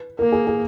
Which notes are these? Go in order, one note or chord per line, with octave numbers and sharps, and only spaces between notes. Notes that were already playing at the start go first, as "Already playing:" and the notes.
Already playing: B4
A#3 A#4
G#4
G#4